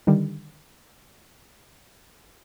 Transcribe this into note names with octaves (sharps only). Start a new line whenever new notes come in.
D3 D#3 G3